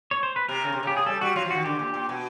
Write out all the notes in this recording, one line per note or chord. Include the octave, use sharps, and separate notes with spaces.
C#5
C5
B4
C3 A#4
C#3
C3
C#3 G4
G#4
G3 A4
G3 F#4
F#3 F4
F3
D#3 F#4
D3 G4
A#2
A#2
B2